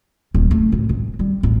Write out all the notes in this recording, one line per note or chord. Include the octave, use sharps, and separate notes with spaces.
D#1
A3
A2
G#1
G3
A1